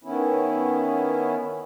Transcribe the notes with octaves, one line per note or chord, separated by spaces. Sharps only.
D#3 B3 C#4 E4